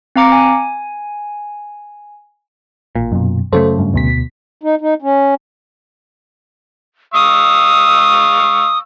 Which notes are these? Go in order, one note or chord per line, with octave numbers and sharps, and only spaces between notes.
C4 F5 A#5 D6 C#7
G#5
A1 A#2
F#2 B2
F#2 C#3 A3 A4 C5
G2
D2 B2 B6
D#4
D#4
C#4
F5 C#6 D#6 E6